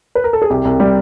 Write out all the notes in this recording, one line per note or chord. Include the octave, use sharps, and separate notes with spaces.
B4
A#4
A4
G#4
C2 G4
C2
G3